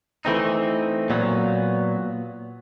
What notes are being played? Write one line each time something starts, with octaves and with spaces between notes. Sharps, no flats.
E3 A3 C4 D#4
A#2 F#3 B3